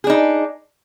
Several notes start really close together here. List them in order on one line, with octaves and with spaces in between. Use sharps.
G#4 D4 D#4